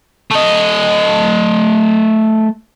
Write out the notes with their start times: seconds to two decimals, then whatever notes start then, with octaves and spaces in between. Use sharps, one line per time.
0.31 A3 D#5